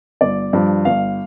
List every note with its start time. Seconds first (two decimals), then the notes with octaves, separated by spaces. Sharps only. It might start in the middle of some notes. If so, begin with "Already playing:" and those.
0.21 G1 D5
0.53 G2 F3
0.85 G1 F5